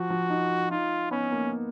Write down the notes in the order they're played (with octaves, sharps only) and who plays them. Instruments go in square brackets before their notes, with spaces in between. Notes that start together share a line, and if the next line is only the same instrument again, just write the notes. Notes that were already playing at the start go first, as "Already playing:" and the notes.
Already playing: [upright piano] F3 [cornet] F#4
[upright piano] F3
D#4
[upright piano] D#4 [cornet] F4
[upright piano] B3 [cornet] C#4
[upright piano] A#3